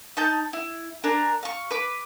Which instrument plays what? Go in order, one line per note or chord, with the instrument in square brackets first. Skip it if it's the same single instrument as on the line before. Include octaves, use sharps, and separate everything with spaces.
[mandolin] D#4 A5 G6
E4
D4 A#4 G#5 A#5
F5 C#6
B4 D6